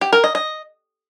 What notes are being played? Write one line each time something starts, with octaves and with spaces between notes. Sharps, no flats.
G4
A#4
D#5
D#5